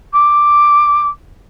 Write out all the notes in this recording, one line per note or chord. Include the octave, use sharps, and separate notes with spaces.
D6